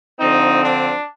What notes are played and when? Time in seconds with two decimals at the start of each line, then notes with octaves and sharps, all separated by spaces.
0.20 D3 F3 C4 D#4
0.63 D4